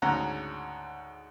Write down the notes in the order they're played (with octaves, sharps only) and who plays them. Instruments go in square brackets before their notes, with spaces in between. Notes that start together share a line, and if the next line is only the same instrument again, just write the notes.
[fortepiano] D2 G#2 C#3 C#4 F#5 A#5